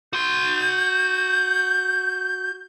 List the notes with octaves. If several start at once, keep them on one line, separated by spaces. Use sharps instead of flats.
F#4 C6 G6